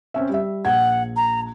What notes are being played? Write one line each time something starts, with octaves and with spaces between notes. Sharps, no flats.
C4 C#4 E5
G3 E5
A#1 F#5 G#6
A#5